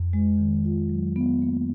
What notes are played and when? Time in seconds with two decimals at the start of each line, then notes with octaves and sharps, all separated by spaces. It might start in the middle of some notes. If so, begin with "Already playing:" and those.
Already playing: F2
0.13 G#3
0.38 D#3
0.65 F4
0.89 F#3
1.16 B3
1.42 A#3